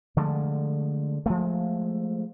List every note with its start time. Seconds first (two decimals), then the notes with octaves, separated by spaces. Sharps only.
0.17 D3 F3 G#3 A3
1.26 F3 G#3 A3